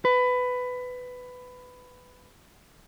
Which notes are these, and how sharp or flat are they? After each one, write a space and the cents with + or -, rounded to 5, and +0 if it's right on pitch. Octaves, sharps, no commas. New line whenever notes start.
B4 +15